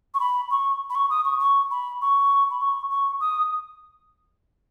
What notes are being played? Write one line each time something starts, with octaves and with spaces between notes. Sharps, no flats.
C#6
B5
C#6
B5
C#6
D#6
C#6
C#6
B5
C#6
B5
C#6
C#6
D#6